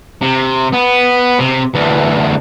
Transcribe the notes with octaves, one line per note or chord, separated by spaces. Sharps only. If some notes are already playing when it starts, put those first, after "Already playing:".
C3
B3
C3
D2 E3